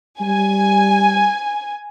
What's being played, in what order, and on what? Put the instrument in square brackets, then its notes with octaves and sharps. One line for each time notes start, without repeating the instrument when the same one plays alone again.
[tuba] G3 [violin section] G#5